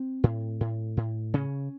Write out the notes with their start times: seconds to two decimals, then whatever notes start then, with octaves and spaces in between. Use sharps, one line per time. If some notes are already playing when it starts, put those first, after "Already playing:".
Already playing: C4
0.24 A2
0.61 A2
0.97 A2
1.34 C#3 C#4